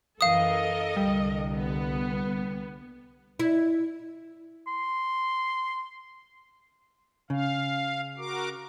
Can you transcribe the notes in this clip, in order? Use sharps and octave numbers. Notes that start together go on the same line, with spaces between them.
F#2 E3 A4 A#4 D#5 F5 D#6
C2 D3 G3
B3
E4
C6
C#3 F5
F#4 A#4 D6